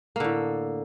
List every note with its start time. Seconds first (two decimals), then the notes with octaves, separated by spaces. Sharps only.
0.16 A#3
0.20 D3
0.24 A2